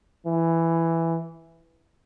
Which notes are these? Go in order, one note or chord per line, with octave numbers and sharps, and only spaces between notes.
E3